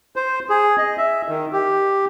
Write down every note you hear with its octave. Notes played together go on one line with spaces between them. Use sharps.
C5
G#4
D#5
E5
D#3
G4